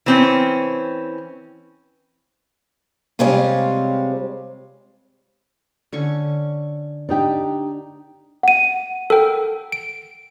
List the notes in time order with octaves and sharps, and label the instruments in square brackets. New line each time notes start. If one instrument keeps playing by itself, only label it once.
[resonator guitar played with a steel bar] E3 C4 C#4
[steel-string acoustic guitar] C3 G3 G#3 C4 C#4 F4
[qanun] D3 C#4 C#6
[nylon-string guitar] D4 D#4 G4
[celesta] F#5 D#7
[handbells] A4 A#4 G5
D7